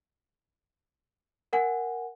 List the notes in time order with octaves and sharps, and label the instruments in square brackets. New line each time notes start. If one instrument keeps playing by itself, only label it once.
[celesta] A#4 F#5 G#5